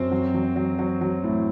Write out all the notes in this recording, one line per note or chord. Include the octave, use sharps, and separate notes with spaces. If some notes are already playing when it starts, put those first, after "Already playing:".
Already playing: F#2 C4 C5
F#3
F#3
F#3
F#3
F#3
A2